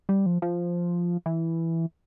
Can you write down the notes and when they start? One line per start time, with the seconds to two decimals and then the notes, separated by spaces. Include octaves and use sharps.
0.09 G3
0.26 F3
0.42 F3
1.26 E3